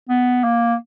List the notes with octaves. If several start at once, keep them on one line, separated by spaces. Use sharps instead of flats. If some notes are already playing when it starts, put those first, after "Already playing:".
B3
A#3